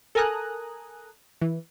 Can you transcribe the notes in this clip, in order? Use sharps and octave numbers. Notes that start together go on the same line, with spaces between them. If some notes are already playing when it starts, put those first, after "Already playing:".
A4 A#4 G#5 A#5 D#6 F#6
E3